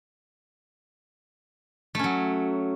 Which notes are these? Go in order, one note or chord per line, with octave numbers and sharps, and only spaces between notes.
F#3 A3 C#4